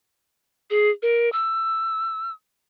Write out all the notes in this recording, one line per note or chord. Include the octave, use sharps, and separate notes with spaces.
G#4
A#4
E6